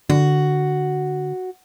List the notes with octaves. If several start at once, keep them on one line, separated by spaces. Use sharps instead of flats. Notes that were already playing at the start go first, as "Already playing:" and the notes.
D3 F#4